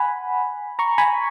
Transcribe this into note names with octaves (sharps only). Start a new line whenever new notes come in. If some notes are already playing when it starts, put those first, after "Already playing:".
Already playing: F#5 G#5 B5
A#5 C#6
G#5 B5